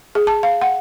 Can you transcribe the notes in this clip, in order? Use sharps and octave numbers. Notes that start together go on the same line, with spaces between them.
G#4
A5
F5
F#5